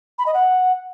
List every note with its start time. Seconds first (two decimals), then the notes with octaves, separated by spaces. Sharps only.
0.19 B5
0.26 D#5
0.34 F#5